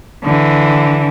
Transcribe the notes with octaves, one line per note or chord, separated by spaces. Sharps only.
D3 E3